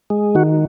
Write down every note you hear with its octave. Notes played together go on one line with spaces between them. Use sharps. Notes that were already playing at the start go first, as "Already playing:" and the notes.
G#3
D#3 F#4